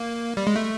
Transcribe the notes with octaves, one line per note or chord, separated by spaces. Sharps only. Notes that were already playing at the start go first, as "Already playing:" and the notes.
Already playing: A#3
G3
G#3
A3